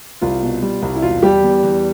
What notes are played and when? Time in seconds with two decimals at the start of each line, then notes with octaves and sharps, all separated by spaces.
0.21 C2 F4
0.43 B2
0.62 G3
0.82 C2
0.96 E4
1.02 E1 F4
1.23 G3 G4
1.43 E2
1.63 E2